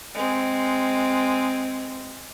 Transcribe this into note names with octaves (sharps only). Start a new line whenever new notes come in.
G#3 C4